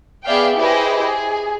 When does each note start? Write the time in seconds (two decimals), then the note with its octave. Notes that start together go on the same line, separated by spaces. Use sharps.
0.25 B3 G#4 D5 E5 F5 G5
0.56 E4 G4 G#4 B4 C5 D#5
1.07 G#4